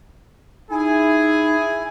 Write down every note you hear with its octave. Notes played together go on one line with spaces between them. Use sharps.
D#4 E4 G#4 G#5